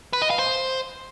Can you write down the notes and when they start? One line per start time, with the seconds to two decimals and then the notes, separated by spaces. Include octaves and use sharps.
0.13 B4
0.22 D#5
0.30 F5
0.39 C5